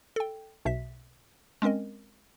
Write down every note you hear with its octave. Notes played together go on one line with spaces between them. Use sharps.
A4 G5
B1 B2 E5 B6
G#3 C4 C#4 A#4 D#5